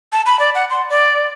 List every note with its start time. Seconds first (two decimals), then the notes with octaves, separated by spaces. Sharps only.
0.13 A5
0.26 B5
0.39 D5
0.55 F#5
0.70 C6
0.90 D5